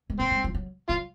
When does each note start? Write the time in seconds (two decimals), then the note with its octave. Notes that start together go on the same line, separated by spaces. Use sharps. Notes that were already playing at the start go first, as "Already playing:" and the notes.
0.10 G#3
0.19 A3 C4
0.31 G#3
0.44 F3
0.54 F#3
0.89 F#3 F4